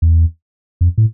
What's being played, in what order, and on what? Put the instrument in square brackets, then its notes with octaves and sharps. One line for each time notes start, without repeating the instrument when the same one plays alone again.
[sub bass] E2
F2
A2